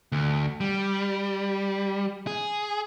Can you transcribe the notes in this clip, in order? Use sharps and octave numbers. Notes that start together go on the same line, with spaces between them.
D2
G3
G#4